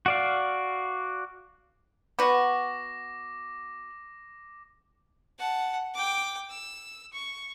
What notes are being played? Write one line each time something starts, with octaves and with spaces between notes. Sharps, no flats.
F#4 D5 F5
B3 F#4 D6 A#6
F#5 A5
G5 D6
E6
C#6